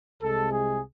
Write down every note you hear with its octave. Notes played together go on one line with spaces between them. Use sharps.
C2 C3 G#3 A4
G#4